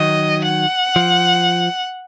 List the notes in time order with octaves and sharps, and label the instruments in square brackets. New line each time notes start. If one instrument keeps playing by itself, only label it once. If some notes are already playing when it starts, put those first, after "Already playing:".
Already playing: [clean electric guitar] D#3 F#3 [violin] D#5
[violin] F#5
[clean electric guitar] F3